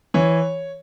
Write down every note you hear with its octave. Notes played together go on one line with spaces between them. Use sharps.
E3 C#5